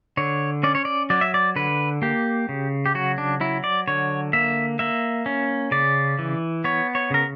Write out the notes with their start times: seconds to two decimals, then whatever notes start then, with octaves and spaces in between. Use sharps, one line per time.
0.17 D3 C#5
0.63 C#4 D5
0.75 C#5
0.85 D5
1.10 F#3 D5
1.21 E5
1.34 D5
1.56 D3 B4
2.02 A#3 G4
2.49 C#3
2.86 G4
2.95 F#3 F#4
3.18 D4
3.40 F#3 E4
3.64 D5
3.88 D3 C#5
4.33 A#3 E5
4.79 A#3 E5
5.26 C#4
5.71 C#3 D5
6.19 E3
6.64 B3 C#5
6.95 C#5
7.10 C#3 A#4